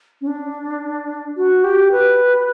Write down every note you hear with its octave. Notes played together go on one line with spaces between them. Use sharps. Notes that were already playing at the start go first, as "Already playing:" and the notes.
C#4
D4
F#4
G4
B4